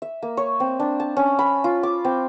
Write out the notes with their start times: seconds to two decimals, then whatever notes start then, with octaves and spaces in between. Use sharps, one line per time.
0.02 E5
0.22 A#3
0.37 C#5
0.60 C4
0.80 D4
1.00 A5
1.17 C#4
1.39 B5
1.64 F4
1.83 D6
2.05 C4